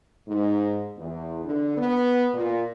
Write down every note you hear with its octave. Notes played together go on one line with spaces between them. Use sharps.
G#2
E2
D3
B3
A#2